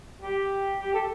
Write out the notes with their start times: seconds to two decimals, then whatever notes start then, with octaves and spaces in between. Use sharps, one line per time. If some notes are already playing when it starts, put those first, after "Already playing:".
0.22 G4
0.80 G4
0.94 A4